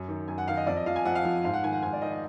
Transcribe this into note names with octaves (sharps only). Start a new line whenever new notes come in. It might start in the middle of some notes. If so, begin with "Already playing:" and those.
Already playing: F#2
D#3
F#2 G#5
F#5
D#3 F5
D#5
F2 D5
D#5
F3 F5
G#5
F2 F#5
F5
F3
G#2 F5
F#5
D#3 G#5
F#5
G#2 G#5
D5
D#3 D#5
D#5